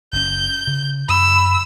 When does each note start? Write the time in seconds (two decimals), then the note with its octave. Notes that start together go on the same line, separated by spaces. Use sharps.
0.13 F#1 C#4 G6
0.67 C#3
1.09 F#2 B5 E6